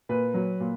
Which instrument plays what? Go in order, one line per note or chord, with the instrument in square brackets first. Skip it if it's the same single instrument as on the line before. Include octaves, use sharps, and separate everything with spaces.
[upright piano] A#2 B4
F#3
A#2